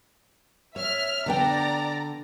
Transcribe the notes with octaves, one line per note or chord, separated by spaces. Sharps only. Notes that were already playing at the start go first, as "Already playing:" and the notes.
C#5 E5 F6
D3 B3 D5 G5 A#5